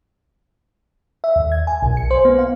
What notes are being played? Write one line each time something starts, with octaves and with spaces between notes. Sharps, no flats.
E5
D#2
G#6
G#5
B1
C#7
C5
B3
F5